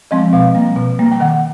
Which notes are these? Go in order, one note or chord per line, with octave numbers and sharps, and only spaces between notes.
F3 G#3 C4 D#5
B2 F5
G3 A#3
B2
G3 A#3
G5
D#3 F#5